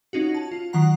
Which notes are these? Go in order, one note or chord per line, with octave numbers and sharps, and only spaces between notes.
C#4 D#4 F4 F#4
A5
F4
D#3 F#3 F#5 A#5 C7